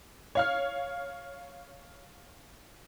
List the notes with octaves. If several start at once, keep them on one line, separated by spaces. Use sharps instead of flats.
C#5 F5 F6